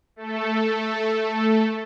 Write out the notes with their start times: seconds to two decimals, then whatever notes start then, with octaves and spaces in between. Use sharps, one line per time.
0.16 A3 A4